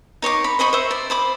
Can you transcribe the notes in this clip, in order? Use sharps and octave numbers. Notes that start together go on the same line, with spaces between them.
D#4 C#5 C6 D6
B5
C5 D#5 B5 C#6
C5 E5
D5
C5 B5 D6